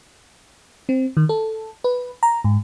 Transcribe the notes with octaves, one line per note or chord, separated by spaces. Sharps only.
C4
D#3
A4
B4
A#5
G#2